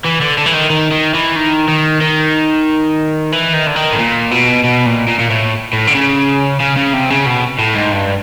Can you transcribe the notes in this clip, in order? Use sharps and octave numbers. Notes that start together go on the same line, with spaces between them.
E3
D3
D3
E3
D#3
D#3
D#3
E3
D#3
D#3
D#3
E3
D#3
D3
D#3
A2
A#2
B2
B2
A#2
A#2
A#2
A2
A2
D3
C#3
C#3
C#3
C3
C#3
B2
A2
G#2
G2